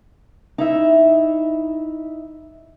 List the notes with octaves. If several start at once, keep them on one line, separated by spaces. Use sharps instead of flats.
D#4 E4 E5